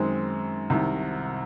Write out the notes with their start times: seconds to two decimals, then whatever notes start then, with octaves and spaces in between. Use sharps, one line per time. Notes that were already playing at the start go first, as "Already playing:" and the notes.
Already playing: F#2 D#3 G#3 C4
0.70 C2 C3 D#3